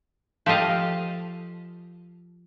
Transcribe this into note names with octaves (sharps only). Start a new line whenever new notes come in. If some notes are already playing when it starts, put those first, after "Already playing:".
F3 G4 A4 D#5 F5